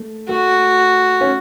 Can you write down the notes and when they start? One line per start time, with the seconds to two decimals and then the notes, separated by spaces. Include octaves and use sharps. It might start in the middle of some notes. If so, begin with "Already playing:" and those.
Already playing: A3
0.29 A3 F#4
1.21 C#4